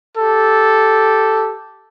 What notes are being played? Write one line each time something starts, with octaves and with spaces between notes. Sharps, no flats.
G4 A4